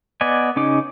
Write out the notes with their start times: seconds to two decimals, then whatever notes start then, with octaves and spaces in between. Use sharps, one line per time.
0.21 B3 D5 D#5 G#5
0.56 C#3 C#4 D#4 D6